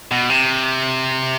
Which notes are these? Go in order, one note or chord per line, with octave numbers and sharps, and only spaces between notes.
B2
C3